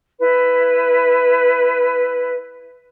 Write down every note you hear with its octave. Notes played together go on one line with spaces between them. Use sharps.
E4 B4